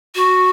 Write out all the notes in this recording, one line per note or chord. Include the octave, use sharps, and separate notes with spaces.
F#4